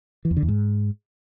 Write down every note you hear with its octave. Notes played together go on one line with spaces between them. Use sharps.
E3
E2
D3
E2
G#2